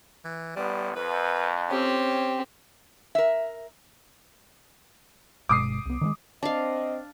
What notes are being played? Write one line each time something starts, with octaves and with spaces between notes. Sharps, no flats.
E3
A1 G3 B3
F2 B4
C4 C#4 G4
A#4 E5
G1 B2 G#3 D6 D#6 C7
C2 B3
D#3 F#3 G#3
C4 D4 D#5 F5